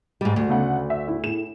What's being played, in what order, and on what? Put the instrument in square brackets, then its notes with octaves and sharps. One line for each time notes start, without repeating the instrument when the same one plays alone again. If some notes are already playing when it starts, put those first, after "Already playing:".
[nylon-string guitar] G#2 G3
D2
[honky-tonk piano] C#3 A3 F#5
E5
E4
A2 G#4 E7